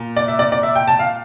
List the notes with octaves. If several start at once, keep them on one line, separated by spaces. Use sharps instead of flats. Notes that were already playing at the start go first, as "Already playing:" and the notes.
Already playing: A#2
D5
E5
D5
D5
E5
G5
A5
F5